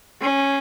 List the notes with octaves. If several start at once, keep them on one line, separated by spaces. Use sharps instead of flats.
C#4